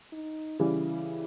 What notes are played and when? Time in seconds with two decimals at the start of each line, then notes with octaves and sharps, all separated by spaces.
0.12 D#4
0.59 C#3 E3 G3 E4